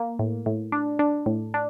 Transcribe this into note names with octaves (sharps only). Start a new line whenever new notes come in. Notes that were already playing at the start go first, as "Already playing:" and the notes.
Already playing: A#3
A2
A2
D4
D4
A2
D4